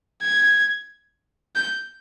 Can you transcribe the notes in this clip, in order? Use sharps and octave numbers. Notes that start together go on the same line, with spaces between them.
G#6
G6